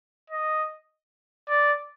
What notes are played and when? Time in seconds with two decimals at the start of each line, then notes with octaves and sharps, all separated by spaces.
0.30 D#5
1.49 D5